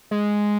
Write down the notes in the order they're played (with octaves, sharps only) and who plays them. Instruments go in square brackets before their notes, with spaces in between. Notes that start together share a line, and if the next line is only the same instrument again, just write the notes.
[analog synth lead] G#3